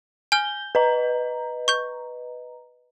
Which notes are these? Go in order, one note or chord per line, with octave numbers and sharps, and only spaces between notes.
G#5 F6 G6 G7
B4 D#5 A#5
C#6 G6